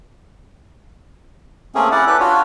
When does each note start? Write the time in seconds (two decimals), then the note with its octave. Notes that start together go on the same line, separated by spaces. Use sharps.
1.75 A3 A#3 C4 C#4 G#4
1.92 C#4 E4 D5 F#5
2.07 G4 A4 B4 F#6
2.20 D4 F4 F#4 C#5